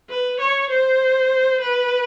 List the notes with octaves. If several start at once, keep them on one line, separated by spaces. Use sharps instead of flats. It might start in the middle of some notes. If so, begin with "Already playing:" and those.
B4
C#5
C5
B4